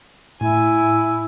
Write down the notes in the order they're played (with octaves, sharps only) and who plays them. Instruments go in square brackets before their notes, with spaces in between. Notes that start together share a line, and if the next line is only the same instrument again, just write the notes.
[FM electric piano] A2 [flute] E4 [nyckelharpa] G#5